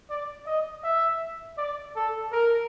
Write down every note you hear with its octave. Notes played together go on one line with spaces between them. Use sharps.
D5
D#5
E5
D5
A4
A#4